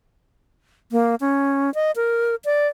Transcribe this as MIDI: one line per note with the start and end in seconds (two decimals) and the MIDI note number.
0.92 1.15 58
1.21 1.73 61
1.75 1.91 75
1.96 2.35 70
2.45 2.68 74